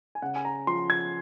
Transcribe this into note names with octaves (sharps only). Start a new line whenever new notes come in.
G#5
C#3 F#5
G#5
A#5
F3 C6
G#6